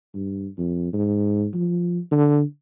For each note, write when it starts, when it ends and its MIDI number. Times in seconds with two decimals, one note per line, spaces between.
0.15 0.48 43
0.58 0.88 41
0.94 1.47 44
1.54 2.00 53
2.12 2.42 50